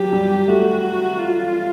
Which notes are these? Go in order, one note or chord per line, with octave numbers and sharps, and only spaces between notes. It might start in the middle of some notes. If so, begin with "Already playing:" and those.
Already playing: F#3 G4
G3
A3 F#4
F4